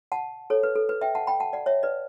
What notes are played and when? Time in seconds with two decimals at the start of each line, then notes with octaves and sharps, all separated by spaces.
0.12 F#5 A5
0.50 A4 C#5
0.63 B4
0.76 A4
0.89 B4
1.01 E5 G5
1.15 F#5 A5
1.27 G5 B5
1.40 F#5 A5
1.53 D5 F#5
1.66 C#5 E5
1.83 B4 D5